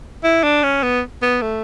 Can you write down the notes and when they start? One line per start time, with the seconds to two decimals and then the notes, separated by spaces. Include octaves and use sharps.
0.24 E4
0.44 D4
0.63 C#4
0.83 B3
1.22 B3
1.42 A3